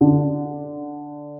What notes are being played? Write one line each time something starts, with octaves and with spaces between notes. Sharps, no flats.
D3